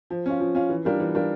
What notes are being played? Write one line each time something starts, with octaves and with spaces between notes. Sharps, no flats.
F3
C#4 F4
F3
C#4 F4
E3
G3 D4 F4 A#4
E3
G3 D4 F4 A#4